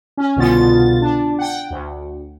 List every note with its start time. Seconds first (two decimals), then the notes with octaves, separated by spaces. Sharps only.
0.17 C#4
0.36 C2 B2 D3 B3 F4 A6
1.02 D4
1.39 F#5 G5
1.70 D2